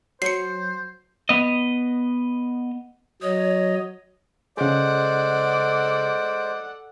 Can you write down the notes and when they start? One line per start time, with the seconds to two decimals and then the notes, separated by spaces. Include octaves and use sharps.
0.22 F#3 C5 C7 C#7
1.29 B3 D#5
3.22 F#3 C#5 D#5
4.57 C#3 G#3 G#4 A4 C5 D5 F#5